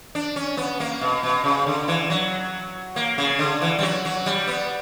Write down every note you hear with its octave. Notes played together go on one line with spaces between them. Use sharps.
D4
C#4
B3
A#3
B2
B2
C#3
D3
E3
F#3
A#3
C#3
D3
E3
G3
F#3
F#3
G3
B3